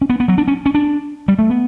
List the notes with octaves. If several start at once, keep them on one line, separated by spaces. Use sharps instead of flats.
C#4
B3
B3
F#3
D4
C#4
C#4
D4
G3
A3
B3